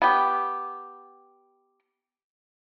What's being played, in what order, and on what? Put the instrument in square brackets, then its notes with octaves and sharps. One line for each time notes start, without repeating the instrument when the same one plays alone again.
[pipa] B3 G4